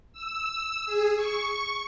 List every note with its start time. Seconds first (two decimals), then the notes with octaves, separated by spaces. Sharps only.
0.13 E6
0.86 G#4
1.16 C#6